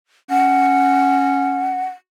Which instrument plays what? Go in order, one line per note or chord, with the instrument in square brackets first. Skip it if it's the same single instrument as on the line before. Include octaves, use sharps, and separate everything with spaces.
[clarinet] C#4 [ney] F#5